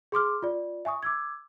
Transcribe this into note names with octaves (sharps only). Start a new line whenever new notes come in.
G#4 C6 D6 F6
F4 D5
E5 G#5 C#6 D#6
D6 E6 G#6